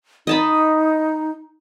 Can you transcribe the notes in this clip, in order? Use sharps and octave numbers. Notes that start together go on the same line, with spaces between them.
D#4 D#5 A5 B5